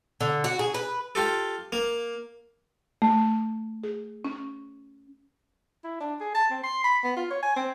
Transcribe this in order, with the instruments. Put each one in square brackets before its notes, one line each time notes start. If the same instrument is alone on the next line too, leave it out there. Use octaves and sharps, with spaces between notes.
[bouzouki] D3
F#4
G#4
B4
[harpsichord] F4 G4 A4
A#3
[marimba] A3
G#4
C#4
[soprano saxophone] E4
D4
G#4
A5
C4
C6
B5
B3
F4
C#5
G#5
C4